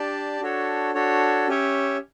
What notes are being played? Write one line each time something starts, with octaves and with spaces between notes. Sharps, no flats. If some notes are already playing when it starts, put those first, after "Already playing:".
Already playing: D4 G4 D5 A5
D4 F#4 A4 C#5
D4 F#4 A4 C#5
C#4 G4 C#5 E5